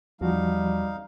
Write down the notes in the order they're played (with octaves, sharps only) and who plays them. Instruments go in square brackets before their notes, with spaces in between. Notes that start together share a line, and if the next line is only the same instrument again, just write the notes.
[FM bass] E2 [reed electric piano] F3 F#4 [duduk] G3 [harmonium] D#4 F5